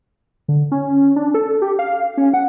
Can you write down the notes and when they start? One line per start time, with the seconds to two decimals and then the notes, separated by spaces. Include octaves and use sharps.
0.48 D3
0.72 C#4
1.16 D4
1.34 A4
1.62 G4
1.79 F5
2.17 C#4
2.34 F#5